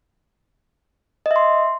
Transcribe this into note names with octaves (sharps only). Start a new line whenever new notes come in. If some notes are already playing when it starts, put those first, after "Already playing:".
D#5
E5
C6